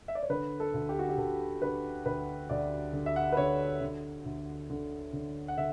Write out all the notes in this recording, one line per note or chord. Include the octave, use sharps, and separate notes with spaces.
E5
D5
C#5
D3 B4
A4
D2
G4
F#4
G4
D2 A4
D3 B4
D2 B4
D2 D5
D3
E5
F#5
B4
D3 C#5
D3
D2
D3
D3
F#5
D3 E5